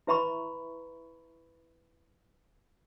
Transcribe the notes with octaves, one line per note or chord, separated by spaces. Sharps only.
E4 B4 E5 A#5 B5 C#6